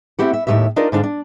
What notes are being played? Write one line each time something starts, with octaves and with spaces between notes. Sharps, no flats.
A3 C4 E4 G4 F#5
E5
D#2 A2 E3 F#3 G4 E5
D4 D#4 F4 A#4 D5 D#5
G#2 D3 D4 F5 G5
D4